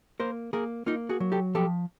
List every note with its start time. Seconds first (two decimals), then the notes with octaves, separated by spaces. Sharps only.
0.20 A#3 A#4 C5
0.53 A#3 G#4 A#4
0.86 A#3 D#4 F4
1.09 F#4 G#4
1.20 F#3
1.32 G4 A4
1.55 F3 G4 A4